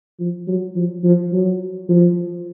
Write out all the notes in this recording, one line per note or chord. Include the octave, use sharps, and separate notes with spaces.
F3
F#3
F3
F3
F#3
F3